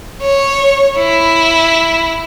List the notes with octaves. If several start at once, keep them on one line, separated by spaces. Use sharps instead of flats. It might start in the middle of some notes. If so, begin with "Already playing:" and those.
C#5
E4